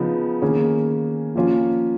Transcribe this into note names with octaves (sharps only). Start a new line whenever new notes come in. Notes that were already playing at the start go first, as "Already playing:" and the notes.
Already playing: C#3 F3 B3 D#4
D#3 A#3 C#4 G#4
F3 A#3 C#4 F4